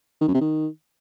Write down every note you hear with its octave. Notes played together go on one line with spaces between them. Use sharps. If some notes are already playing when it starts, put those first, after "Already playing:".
D#3
F#2
C3
D#3